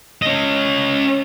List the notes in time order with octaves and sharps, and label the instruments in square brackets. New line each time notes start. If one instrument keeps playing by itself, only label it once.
[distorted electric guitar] C#4 D#5